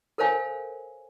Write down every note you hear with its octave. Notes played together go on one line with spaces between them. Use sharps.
A4 A#4 C5 C#5 F5 G#5